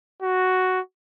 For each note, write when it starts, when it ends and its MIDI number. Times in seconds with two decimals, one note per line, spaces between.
0.22 0.80 66